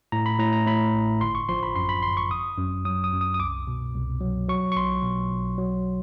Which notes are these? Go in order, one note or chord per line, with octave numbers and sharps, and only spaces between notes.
A2 A#5
B5
A2 A#5
A#5
A2 B5
A1
G1 C6
C#6
F3 C6
B5
F#2 C6
B5
G1 C6
C#6
G#1 D#6
F#2
F#3 D#6
D#6
F#2
D#6
D#6
C2 D6
B2
C2
F#3
F#3 C#6
C#6
B1 C6
B2
B1
F#3